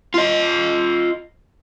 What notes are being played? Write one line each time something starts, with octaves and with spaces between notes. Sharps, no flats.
F4 D#5